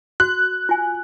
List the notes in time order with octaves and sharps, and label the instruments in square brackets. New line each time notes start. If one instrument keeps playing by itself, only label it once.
[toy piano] F#4 [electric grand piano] F#6
[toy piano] F4 G#5